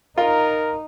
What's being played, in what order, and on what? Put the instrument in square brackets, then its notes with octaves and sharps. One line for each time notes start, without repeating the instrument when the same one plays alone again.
[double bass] D#4 [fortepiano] F4 [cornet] A#4